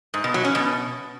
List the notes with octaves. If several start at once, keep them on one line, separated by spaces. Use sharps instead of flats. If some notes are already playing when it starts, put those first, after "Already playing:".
G#2
B2
F#3
C#4
B2